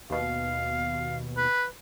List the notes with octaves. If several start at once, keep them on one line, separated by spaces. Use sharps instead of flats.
D#2 B2 F5
B4